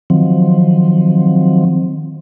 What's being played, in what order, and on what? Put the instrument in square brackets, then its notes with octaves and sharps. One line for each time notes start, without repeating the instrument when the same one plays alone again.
[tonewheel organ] D#3 F3 F#3 C4